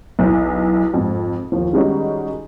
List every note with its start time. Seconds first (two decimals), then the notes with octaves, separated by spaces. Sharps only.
0.19 B1 E2
0.94 F2 G#2
1.52 D#2 F3
1.73 D#3 G3 G#3 C#4 D#4 F#4